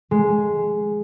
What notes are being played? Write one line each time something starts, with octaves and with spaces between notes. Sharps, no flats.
G#3